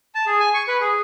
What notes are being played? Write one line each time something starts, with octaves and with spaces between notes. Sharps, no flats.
A5
G#4
G#5
C#6
B4
G#4